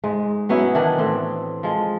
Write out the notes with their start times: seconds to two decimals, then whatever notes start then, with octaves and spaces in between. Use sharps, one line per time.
0.04 G#2 G#3
0.49 F#3 B3 C#4 E4
0.75 D#3 E3 D4
0.98 A2 C4
1.63 F3 G#3